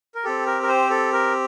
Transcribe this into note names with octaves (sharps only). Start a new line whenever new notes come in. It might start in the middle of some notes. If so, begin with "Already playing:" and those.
A#4
C4 G4 A4
A#4
A#4
C5
A4
A#4